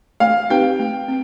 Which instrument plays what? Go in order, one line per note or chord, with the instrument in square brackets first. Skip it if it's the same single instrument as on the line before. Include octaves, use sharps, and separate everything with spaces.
[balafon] A3 [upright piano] F5
[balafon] C4 D#4 G4 B4 [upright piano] G5
[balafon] A3
C4